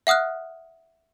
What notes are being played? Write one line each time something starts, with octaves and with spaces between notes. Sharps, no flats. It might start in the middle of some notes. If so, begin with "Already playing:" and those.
E5 F#5 D#6 F6 F#6